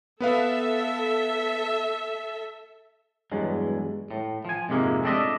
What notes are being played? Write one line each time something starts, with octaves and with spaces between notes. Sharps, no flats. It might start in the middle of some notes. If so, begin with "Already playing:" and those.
B3 A4 B4 E5 F5
E2 G2 F#3 G#3
A2
F3 G#5
F2 G#2 C3 G#3 A#3
A3 C4 D4 F4 D#5 E5